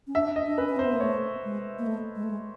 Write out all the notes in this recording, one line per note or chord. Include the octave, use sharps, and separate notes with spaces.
C#4
D4 E5
D#5
D4
C#4 B4
C#4
C4 C5
B3
A#3
A3 C#5
G#3
A#3
A3
G#3
A3
G#3